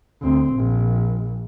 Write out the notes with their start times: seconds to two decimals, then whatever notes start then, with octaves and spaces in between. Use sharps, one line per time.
0.22 D2 C4
0.54 A#1